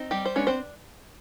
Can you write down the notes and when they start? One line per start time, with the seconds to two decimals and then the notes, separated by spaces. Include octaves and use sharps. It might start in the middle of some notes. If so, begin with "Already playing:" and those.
Already playing: C4 D#4
0.11 G3 G4
0.26 C5
0.36 G#3 B3 C#4 D4 C#5
0.47 C4 C5